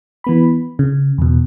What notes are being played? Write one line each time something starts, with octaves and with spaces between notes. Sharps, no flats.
E3 B3 B5
C#3
E2 B2